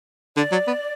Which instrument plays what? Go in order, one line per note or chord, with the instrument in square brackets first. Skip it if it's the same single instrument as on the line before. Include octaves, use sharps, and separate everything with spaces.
[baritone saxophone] D3 [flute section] D5
[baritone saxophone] F#3
B3